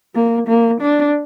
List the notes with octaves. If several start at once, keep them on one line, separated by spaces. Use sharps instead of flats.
A#3
A#3
D4